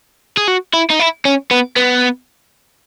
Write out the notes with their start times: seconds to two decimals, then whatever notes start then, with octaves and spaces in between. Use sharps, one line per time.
0.37 G#4
0.48 F#4
0.73 E4
0.90 D#4
0.99 E4
1.25 C#4
1.51 B3
1.76 B3